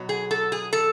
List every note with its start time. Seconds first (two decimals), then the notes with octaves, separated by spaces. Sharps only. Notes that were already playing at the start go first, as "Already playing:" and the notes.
Already playing: B2 F#3
0.09 G#4
0.31 A4
0.52 G#4
0.73 A4